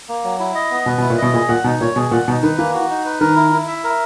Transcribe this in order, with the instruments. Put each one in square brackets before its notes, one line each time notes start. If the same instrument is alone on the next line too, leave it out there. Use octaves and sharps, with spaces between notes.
[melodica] A#3
F#3
E4
D#5
B3
[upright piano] B2 [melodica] B4
[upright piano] B2
[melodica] E4
[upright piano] A#2
[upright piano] B2 [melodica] D#5
[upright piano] A#2 [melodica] G#4
[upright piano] A#2 [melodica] F#5
[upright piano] B2 [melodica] D#4
[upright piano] A#2 [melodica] C#5
[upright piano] B2 [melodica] G#4
[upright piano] A#2 [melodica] F#5
[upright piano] B2 [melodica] D#4
[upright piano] D#3 [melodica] B4
[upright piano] E3 [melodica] A#3
[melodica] F#4
D#4
B4
[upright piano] D#3 [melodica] A#4
[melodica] E4
E4
E5
A#4